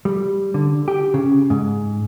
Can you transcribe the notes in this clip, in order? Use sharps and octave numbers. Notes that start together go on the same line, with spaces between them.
G3
D3
G4
C#3
G#2